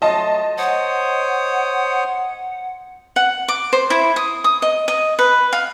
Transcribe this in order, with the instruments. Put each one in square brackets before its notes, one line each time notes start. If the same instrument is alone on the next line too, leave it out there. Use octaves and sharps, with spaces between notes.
[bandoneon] F#3 A3 [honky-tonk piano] D#5 A5 C6
[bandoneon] C5 C#5 D#6 [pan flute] F#5
[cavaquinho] F#5
D6
C5
E4
D#6
D#6
D#5
D#5
B4
F5